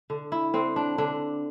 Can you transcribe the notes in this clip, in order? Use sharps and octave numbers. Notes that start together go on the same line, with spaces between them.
D3
E4
D3 C4
D4
D3 D4